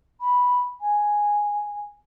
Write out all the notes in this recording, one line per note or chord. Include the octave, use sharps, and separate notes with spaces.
B5
G#5